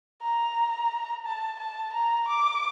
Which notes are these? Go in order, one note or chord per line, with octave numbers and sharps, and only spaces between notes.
A#5
A5
A5
A#5
D6